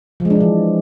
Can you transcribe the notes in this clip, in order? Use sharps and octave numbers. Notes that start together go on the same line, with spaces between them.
F3
G#3
D4
F3
E3